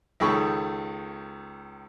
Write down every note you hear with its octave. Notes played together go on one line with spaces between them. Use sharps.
C#2 D#3 G#4 A4 B5 C#6